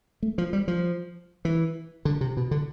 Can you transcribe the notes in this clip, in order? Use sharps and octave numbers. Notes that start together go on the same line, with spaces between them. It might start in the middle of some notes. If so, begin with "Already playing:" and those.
A3
F3
G3
F3
E3
D3
C3
B2
D3